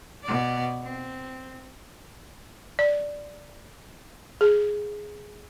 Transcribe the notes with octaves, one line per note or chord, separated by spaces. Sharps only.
B2 D5
C4
D5
G#4